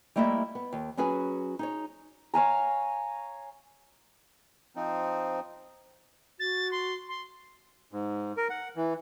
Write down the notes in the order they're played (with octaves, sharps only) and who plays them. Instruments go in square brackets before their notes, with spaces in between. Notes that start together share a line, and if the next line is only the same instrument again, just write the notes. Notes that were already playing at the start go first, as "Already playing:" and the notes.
[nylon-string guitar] G3 A3 A#3 E4 D#5 E5
B3
D#2
F#3 C#4 F#4 G#4 B4 G#5
D#4 G#4 C#5
[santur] C#5 F5 G#5 A#5
[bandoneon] F3 C4 D#4
[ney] F#4 [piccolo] A6
[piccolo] C6
C6
[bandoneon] G#2
A#4
F#5
E3